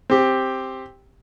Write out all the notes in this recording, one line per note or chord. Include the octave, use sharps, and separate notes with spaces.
C4 G4